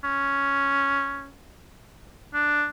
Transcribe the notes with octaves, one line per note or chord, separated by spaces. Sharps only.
C#4
D4